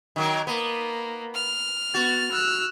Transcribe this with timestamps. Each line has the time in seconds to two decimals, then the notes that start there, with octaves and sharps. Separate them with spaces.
0.16 D#3 F#3 A#3
0.47 A#3 B3
1.34 F6
1.94 B3 F#4 A6
2.31 E6 F#6